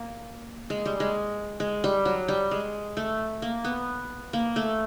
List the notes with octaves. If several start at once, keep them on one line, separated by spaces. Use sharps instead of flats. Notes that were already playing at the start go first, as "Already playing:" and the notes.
Already playing: A#3
G#3
G3
G#3
G#3
G3
F#3
G3
G#3
A3
A#3
B3
A#3
A3